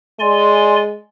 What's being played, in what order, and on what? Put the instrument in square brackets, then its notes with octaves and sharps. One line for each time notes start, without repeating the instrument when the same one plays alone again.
[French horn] G#3 [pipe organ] D5 G#5 C6